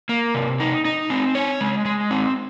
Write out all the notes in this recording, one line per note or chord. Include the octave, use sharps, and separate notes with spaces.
A#3
C3
D#4
D#4
C4
C#5
G#3
G#3
C4